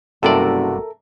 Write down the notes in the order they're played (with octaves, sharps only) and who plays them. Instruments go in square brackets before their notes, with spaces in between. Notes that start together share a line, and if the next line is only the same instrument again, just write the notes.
[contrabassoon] F#1 [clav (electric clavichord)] G2 C3 D5 [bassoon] F#4 [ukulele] A4 A#4 E5